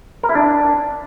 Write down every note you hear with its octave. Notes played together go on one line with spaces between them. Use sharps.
A#4
E4
D4